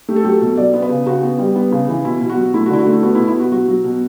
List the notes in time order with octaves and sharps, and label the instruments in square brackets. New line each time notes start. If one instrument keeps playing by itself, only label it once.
[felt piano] A3 G4
A4
F#3 G4
A4
B2
F#3 D5
B3
B4
C#3
C#3 F#4
B3
G3
B3
C#3
E3
B2 E4
B2
F#4
F#3
A3 E4
F#4
D3 E4
F#4
A3 E4
B3 F#4
E4
B2
E4
B2 F#4
F#3 F#4
F#3
B2